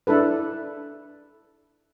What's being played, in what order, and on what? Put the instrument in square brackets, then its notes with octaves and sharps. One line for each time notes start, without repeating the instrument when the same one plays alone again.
[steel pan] D4 E4 A4 B4